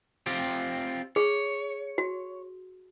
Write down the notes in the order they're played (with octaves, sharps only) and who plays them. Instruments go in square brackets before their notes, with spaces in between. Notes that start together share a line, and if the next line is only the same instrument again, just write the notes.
[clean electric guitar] C4 F4 G4
[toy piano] G#4 [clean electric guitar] C#5
[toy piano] F#4